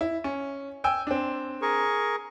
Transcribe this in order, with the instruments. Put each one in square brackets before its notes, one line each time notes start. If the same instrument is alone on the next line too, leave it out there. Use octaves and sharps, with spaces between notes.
[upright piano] E4
C#4
G5 G#5 E6
C4 D4
[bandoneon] G#4 A#4 C#6